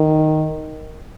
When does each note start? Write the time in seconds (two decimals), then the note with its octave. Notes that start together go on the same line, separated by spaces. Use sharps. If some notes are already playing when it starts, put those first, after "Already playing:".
Already playing: D#3